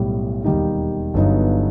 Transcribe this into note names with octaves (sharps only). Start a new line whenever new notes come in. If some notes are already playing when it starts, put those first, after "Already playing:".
Already playing: B1 A2 G3
E1 D#2 D#3 G3 D#4
G1 G2 F#3 B3 D#4